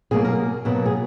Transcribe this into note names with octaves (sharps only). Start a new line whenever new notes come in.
B2 F#3 A#3 G#4
A#4
B2 F#3 A#3 B4
G#4